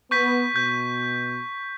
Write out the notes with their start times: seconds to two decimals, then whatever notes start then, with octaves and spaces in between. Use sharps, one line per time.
0.11 B3 C#6 G6 B6
0.56 B2 G6